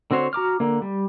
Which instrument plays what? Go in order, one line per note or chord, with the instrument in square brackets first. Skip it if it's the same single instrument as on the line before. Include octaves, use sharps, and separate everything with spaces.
[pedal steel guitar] D3 C4 F#4 C5 C#5
F#4 A#5 D6 F6
D3 A#3
G3